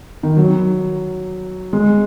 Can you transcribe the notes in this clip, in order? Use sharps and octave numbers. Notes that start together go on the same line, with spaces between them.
D#3
F#3
G#3